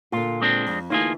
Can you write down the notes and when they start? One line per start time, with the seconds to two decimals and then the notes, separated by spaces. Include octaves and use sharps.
0.12 A#2 D3 F4
0.42 G#3 C4 D4
0.67 F2
0.90 D2 E3 A#3 D#4 F4 G#4